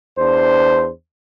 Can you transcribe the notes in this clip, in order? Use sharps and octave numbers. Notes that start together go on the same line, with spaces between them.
E2 D4 C5